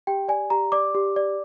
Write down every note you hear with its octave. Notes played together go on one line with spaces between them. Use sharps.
G4 G5
D5 G#5
G4 A#5
D5 D6
G4
D5